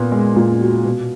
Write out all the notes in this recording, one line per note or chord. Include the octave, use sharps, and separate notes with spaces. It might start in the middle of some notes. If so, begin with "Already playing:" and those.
Already playing: A#2 B3
G#3
A#2
F#4
B2